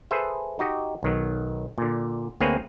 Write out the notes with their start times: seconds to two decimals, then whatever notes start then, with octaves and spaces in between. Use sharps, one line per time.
0.11 G#4 A4 B4 C5 E5
0.59 D#4 F#4 G4 D#5
1.03 B1 D#3 F#3
1.78 A#2 D3
2.40 D2 A#3 C4 G#4 B4 C#5